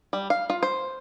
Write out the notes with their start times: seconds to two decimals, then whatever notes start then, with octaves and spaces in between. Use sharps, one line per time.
0.13 G3
0.30 F5
0.50 F4
0.63 C5